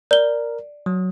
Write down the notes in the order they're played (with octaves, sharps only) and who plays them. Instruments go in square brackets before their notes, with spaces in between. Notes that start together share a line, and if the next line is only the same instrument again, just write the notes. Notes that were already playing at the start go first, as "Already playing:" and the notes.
[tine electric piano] A#4 [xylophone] D5 G7
[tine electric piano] F#3